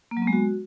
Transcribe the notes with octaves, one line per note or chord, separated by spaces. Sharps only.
A#3
F#3
B3
G#3
F#4